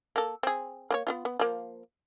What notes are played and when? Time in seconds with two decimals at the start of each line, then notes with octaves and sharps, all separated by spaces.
0.16 A#3 A4
0.43 C4 G#4
0.91 A#3 C5 C#5
1.07 B3 C#4 F4
1.25 B3
1.39 F3 A#3